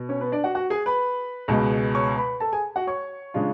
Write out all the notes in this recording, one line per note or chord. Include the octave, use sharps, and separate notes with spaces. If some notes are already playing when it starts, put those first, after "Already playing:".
Already playing: B2
C#4 C#5
B3 B4
D4 D5
F#4 F#5
F#4 F#5
G#4 G#5
B4 B5
C#2 B2 G#3
C#5 C#6
B4 B5
A4 A5
G#4 G#5
F#4 F#5
C#5 C#6
C#3 G#3 D4 F4